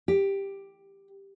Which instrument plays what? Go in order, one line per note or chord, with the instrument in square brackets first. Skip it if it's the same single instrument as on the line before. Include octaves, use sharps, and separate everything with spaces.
[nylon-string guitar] G4